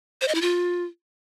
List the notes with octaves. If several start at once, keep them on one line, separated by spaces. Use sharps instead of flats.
C5
D#5
E4
F4